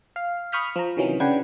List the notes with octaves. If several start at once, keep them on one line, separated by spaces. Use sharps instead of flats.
F5
B5 C#6 D#6 F6 G6 B6
F3 A#5
C3 D#3 E3 F#3 C#4
C#3 D4 B4 F#5 G5 G#6